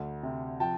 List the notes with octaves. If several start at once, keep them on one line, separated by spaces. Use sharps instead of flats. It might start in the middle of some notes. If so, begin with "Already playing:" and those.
Already playing: D2
C3
F3 G5 A5